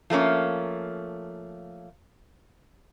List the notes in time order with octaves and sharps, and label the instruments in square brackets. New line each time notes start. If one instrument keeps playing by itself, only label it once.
[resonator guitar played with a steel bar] F3 A3 A#3 C#4